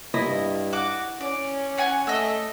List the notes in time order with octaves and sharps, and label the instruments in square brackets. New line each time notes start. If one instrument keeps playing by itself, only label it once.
[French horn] G2 [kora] E4 D#5
[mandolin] F#4 D6
[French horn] C#4 [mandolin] D5
[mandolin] C#5 F#5 G#5
[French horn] A3 [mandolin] D#5 E6